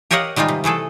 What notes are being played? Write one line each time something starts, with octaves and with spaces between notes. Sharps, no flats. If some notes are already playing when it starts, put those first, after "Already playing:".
G4 A#4 C#5 D#5 F5 F#5
D#3 G3 G#3 D#4 F4
C3
E3 A3 G#4 A4